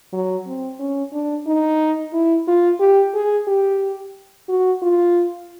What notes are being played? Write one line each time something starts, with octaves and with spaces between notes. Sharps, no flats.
F#3
C4
C#4
D4
D#4
E4
F4
G4
G#4
G4
F#4
F4